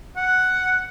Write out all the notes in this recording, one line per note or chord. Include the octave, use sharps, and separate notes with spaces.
F#5